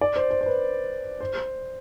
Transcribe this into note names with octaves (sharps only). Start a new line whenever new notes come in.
D5
C5
C5
C5
B4
C5